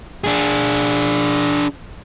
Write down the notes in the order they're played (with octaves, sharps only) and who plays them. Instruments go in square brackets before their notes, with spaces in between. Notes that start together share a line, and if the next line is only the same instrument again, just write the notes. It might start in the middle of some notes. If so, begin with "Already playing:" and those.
[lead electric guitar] D4 G#4